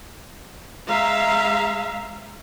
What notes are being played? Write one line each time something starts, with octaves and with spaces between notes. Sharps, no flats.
G#3 E5 F5 A#5